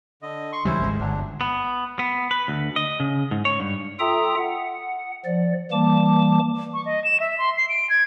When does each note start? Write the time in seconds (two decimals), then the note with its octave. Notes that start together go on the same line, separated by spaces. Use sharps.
0.22 D3 D#5
0.53 C6 C#6
0.65 C#2 E3 G3 C#4 E4 C5
0.82 G#1 G#3
1.00 G1 F#3 D4
1.41 B3
1.99 B3
2.31 B4
2.48 D2
2.76 D#5
3.00 C#3
3.31 G#2
3.45 C#5
3.60 G2
3.99 F4 A4 E5 G5 A#5 D#6
4.37 F#5
5.25 F3 D5
5.71 E3 G3 A#3 A5 D6
6.74 C#6
6.85 D#5
7.04 E7
7.20 E5
7.38 C6
7.57 C7
7.69 D7
7.90 G#6